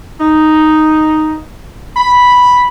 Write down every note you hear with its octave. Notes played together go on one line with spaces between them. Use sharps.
D#4
B5